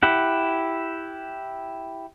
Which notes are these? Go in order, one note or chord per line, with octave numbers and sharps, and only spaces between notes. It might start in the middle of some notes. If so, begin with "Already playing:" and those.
E4 G4 F#5